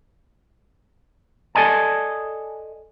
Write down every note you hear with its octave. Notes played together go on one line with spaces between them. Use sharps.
A4 D5 D#5 G#5 A5